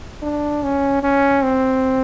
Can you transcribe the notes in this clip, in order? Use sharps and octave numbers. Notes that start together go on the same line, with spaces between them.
D4
C#4
C#4
C4